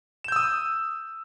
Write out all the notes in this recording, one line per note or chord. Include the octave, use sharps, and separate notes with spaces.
D#6 E6 G6 E7